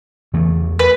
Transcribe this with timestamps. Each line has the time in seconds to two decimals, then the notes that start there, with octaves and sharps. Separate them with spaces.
0.33 E2 E3 A3
0.79 B4